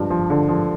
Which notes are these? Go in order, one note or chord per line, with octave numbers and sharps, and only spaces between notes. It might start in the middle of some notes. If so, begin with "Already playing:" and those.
Already playing: G2 F3
F3
D3
F3